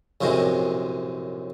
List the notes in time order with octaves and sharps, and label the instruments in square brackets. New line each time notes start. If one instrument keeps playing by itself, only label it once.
[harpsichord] A#1 F#2 A2 C3 G#3